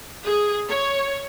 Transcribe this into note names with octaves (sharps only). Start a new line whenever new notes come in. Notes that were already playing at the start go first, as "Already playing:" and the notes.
G#4
C#5